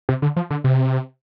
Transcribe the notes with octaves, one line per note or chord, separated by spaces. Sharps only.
C3
D3
F3
D3
C3